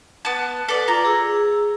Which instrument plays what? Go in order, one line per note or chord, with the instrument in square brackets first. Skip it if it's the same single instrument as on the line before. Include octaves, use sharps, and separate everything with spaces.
[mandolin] B3 A5
[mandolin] A4 D5 [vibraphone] B4
[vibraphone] F4 [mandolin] A#5
[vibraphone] G#4 E6